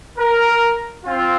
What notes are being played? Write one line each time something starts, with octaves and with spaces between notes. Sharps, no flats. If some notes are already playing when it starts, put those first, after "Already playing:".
A#4
C4 F4